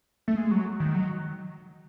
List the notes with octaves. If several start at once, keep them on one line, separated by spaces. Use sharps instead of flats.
A3
G#3
F#3
D#3
F#3